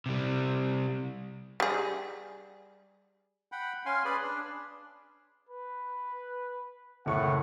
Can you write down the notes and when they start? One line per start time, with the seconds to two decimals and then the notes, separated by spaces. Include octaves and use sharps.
0.06 C3 G3
1.60 G3 G#4
3.52 F#5 G5 B5
3.86 C#4 F5 G#5 C6
4.05 G#4 B4 D5 B5 C6
4.22 D4
5.49 B4
7.06 F#1 A2 F#5 C#6